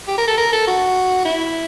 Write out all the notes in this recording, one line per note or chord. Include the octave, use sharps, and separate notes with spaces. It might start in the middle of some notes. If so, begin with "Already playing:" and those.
G4
A#4
A4
A#4
A4
F#4
E4